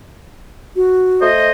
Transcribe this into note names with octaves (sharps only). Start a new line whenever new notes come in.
F#4
A3 C5 D#5